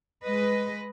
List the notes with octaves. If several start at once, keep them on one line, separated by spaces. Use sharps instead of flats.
G#3 B4 D#5